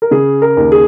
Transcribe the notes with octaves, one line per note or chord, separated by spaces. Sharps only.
A#4
C#3 G#4
A#4
D#2
G#4